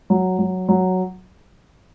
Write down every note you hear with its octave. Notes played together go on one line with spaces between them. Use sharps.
F#3
F#3
F#3